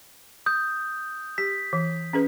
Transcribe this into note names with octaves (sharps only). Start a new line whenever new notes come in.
D#6 G6
G4 B6
E3
C#4 G#4 B4